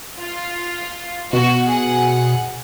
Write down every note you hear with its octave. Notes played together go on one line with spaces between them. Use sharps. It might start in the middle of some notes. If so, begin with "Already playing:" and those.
F4
B2 F#4
G#4 F#5